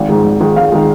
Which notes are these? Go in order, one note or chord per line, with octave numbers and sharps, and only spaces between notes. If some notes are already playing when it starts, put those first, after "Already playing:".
Already playing: G#1
G#2 D#3 G#3
G#1
G#2 D#3 G#3
G#1 F5
D#3 G#3